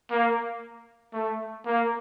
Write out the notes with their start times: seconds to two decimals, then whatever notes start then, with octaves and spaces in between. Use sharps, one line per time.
0.11 A#3
1.13 A3
1.66 A#3